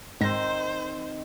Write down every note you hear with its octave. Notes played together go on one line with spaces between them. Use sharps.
G#2 D#3 C4 C5 A#6